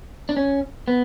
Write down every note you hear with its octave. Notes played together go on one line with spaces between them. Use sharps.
D4
C#4
B3